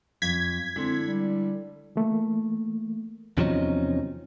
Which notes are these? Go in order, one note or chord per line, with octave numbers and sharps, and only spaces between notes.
F2 G#6 B6
D3 G#3 C4 E4
G3
E3 A3 A#3
E2 C3 F3 F#3 C#4 D#4